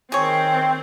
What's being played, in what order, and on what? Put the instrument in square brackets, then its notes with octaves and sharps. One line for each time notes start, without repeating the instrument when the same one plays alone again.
[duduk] D#3 [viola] C4 C5 [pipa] G#4 C#5 [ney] G5